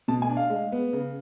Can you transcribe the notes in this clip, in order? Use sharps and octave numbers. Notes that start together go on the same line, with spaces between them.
B2 A5
G#5
D4
F5
G#3
B3
C#3